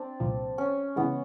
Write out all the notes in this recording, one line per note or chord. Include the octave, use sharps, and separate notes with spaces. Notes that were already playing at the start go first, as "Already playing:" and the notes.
Already playing: C4 D4
C2 A#2 F3
C#4
C#3 E3 G#3 B3